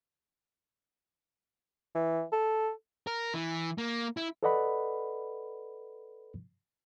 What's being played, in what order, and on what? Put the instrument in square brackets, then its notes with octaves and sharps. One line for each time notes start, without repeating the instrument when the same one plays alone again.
[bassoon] E3
A4
[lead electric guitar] A#4
E3
A#3
E4
[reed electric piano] A4 B4 D5 D#5 F#5 B5